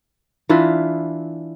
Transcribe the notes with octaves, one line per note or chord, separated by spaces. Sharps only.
E3 D4 E4 F4